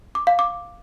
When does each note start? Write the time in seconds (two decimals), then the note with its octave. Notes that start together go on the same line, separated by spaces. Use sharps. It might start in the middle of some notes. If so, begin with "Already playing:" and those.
0.15 D6
0.27 F5
0.39 D6